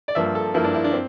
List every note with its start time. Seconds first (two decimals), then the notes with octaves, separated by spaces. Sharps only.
0.08 D5
0.15 G2 F3 A#3 E5
0.35 A4
0.54 G2 F3 A#3 E4
0.64 D4
0.74 E4
0.84 D4
0.93 C4